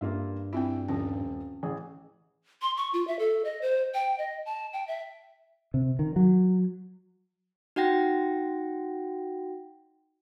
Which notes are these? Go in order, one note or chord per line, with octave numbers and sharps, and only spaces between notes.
G2 A#3 F4 E5
C4 E4 F4 G5
D#1 F3 C#4
A1 E3 G#4
C6
C#6
F4
E5
A4
D#5
C5
G5
D#5
A5
G5
E5
C3
D#3
F#3
D#4 F#4 F#5 G5 A#6